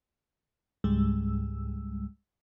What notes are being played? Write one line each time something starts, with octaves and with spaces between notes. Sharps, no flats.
C#2 G#2 G3 G#3 E6